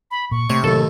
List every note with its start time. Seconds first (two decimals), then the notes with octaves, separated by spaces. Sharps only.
0.11 B5
0.31 A#2 C#6
0.50 C3 A3 C#5
0.64 D#2 A2 C3 F#3 A4